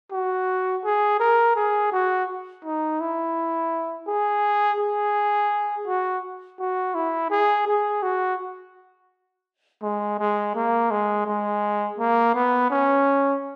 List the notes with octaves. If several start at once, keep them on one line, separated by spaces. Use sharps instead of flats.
F#4
G#4
A#4
G#4
F#4
D#4
E4
G#4
G#4
F#4
F#4
E4
G#4
G#4
F#4
G#3
G#3
A#3
G#3
G#3
A#3
B3
C#4